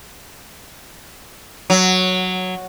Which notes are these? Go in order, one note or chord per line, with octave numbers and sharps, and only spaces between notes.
F#3